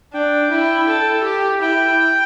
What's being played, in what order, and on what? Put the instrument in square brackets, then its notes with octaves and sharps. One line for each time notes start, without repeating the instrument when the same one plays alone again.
[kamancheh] D4 [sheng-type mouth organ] G5
[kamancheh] E4
A4
G4
[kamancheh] E4 [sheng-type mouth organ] G5